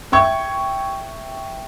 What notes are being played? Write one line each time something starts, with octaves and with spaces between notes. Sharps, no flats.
E5 G5 C#6 G#6